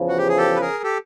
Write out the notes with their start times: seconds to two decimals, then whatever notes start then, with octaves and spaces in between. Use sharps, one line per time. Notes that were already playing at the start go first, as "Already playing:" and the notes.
Already playing: E2 C#3 F3
0.09 F#4
0.18 G4
0.28 G#4
0.37 G4 A4
0.56 B4
0.61 G#4 A#4
0.84 G4 A4